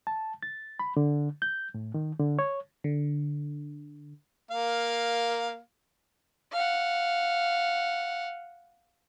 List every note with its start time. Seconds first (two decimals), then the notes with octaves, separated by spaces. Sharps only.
0.07 A5
0.43 A6
0.79 B5
0.97 D3
1.42 G6
1.74 A2
1.94 D#3
2.20 D3
2.39 C#5
2.84 D3
4.51 A#3 F5
6.52 F5 F#5